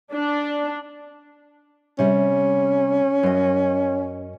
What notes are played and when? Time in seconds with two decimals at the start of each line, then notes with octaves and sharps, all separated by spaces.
0.13 D4
1.99 C3 G3 C#4
3.23 F#2 D#5